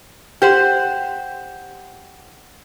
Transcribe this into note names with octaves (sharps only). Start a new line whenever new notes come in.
G4 C5 F#5